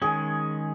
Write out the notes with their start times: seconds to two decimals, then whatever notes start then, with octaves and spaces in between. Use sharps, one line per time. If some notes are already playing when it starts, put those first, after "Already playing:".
0.02 D#3 G#3 C#4 G#4